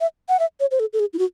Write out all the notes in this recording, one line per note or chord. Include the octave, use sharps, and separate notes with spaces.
E5
F#5
E5
C#5
C5
A4
A4
G#4
E4
F#4